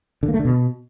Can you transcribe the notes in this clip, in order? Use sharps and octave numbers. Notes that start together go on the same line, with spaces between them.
D3
A#3
A3
D3
B2